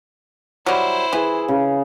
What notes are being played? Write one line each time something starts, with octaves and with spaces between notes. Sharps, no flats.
F#3 G3 E4 C5
E3 G#4
C#3